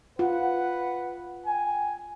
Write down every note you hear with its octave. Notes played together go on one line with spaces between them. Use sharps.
F4 B4 F#5
G5 G#5